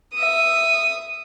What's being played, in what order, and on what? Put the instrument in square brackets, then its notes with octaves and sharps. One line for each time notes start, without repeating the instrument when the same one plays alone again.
[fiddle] E5 D#6